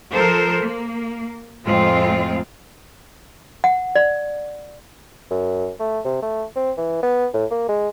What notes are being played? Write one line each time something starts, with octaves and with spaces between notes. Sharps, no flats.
F3 A4 A#4 C5
A#3
F2 A2 G#3 C4 F4
F#5
D5
F#2
A3
C3
A3
C4
E3
B3
A2
A#3
G#3